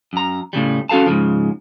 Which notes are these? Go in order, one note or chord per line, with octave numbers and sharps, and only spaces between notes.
F#2 A#5
A2 C#3 F#3 G3
C#4 F#4 A4 F5 A5
G#2 C#3 F3